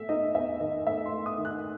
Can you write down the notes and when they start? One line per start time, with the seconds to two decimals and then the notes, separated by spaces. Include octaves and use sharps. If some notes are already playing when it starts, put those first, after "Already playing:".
Already playing: A3 E5
0.09 D#4 D#5
0.35 E2 E5
0.60 D#3 D#5
0.87 A3 E5
1.06 C6
1.13 A3
1.26 D#6
1.38 D#3
1.45 F#6